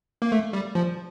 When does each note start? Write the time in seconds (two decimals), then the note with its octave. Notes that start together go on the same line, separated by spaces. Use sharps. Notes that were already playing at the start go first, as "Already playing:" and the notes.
0.22 A#3
0.32 A3
0.53 G3
0.75 F3